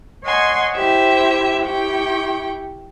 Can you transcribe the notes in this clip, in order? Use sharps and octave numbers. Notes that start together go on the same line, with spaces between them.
C#5 D#5 F#5 G#5 C6
E4 G4 C5 E5
E4 G4 G5 C#6